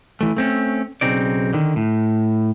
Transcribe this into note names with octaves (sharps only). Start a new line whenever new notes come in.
E3 A3
A3 C4 C#4
B1 C#3 C4 D#4 D5
D3 D#3
A2